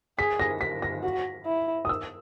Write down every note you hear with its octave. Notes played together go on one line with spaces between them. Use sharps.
G#4 B6
A#6
B6
A#6
F#4
E4
D#6
E6